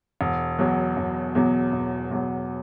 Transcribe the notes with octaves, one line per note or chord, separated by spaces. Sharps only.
E1
E2 B2 F#3
E1
E2 B2 F#3
E1
E2 B2 F#3